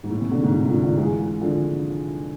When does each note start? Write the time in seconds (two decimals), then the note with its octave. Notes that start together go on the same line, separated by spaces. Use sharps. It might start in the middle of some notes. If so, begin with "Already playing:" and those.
0.04 G#2
0.10 A2
0.21 C3 E3
0.31 B2 D3
0.43 G#2 B2
0.53 A2 C3
0.68 D3 F3
0.83 D3 F3
0.97 E3 G#3
1.41 D3 F3